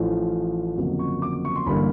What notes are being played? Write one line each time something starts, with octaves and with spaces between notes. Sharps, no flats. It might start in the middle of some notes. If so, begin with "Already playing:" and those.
Already playing: A1 A2 F3 A3
G1 F2 C#3 F#3 A#3
C#6
D6
C#6
C6
A1 G2 D3 G3 A#3 B5